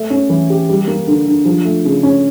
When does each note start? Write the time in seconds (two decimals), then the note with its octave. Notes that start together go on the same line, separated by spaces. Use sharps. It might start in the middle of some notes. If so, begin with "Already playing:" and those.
Already playing: A3
0.10 C#4
0.30 E3
0.50 G4
0.69 G3
0.87 A#3
1.07 D3
1.27 D3
1.45 F3
1.65 A3
1.85 C#3
2.03 C#4